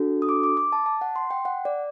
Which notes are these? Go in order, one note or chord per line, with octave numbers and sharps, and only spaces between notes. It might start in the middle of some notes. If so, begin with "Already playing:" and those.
Already playing: D4 F#4 A4
D#6
D6
D6
D6
A5
A5
F#5
C6
G5
F#5
D5